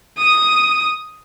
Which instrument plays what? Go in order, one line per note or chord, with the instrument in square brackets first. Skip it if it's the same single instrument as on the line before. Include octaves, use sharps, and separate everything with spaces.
[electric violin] D#6